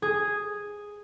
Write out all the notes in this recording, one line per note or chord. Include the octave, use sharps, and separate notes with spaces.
G#4